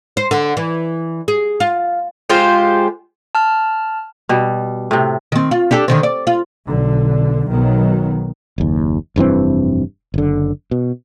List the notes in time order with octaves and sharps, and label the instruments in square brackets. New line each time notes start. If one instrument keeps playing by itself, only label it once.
[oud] C5
D3
E3
G#4
F4
[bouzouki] G#3 F4 G4 C5
[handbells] A5 F6
[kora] B2 G3
A2 C3
[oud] D#3 C4
F4
D4 G4 A4
D3 D#3 C4
D5
F4
[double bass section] B1 D3
B1 D#3 F#3 B3
[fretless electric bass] F#1 D#2
F1 G2 E3 C4
F#1 D3
B2